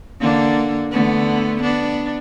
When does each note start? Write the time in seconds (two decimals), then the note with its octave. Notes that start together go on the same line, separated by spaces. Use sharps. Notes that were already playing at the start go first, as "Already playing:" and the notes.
0.20 D3 A#3 D4
0.91 D3 A3 B3
1.61 B3 D4